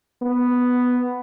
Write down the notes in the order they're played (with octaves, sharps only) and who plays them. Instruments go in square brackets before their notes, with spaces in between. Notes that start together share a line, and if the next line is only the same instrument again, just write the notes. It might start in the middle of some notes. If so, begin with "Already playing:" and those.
[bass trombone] B3